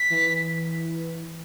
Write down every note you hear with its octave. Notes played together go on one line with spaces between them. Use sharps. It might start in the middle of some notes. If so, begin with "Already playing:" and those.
Already playing: B6
E3